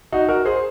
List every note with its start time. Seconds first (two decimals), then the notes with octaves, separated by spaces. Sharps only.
0.12 D#4 F#4
0.29 F#4 A#4
0.45 G#4 C5